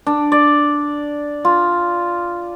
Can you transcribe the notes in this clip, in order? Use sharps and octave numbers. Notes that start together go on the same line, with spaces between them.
D4
D5
F4